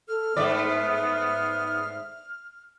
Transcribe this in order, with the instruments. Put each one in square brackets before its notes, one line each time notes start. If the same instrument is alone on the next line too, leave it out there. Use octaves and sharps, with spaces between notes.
[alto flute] A4 [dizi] F6
[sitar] G#2 A3 D5 [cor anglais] B3 [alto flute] E5